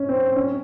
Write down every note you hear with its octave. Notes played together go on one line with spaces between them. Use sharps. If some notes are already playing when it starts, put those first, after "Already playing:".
Already playing: C#4
C4
C#4